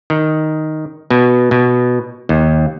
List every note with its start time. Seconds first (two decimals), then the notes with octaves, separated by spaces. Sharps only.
0.10 D#3
1.11 B2
1.51 B2
2.29 D#2